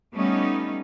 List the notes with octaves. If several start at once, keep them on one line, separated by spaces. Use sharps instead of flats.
G3 A3 B3 C#4 D#4